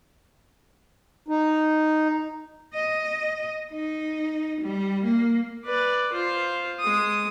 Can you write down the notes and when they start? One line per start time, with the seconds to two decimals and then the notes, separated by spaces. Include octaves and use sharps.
1.28 D#4
2.74 D#5
3.72 D#4
4.61 G3
5.04 A#3
5.65 B4 D5
6.12 F4 C5
6.80 G#3 D#6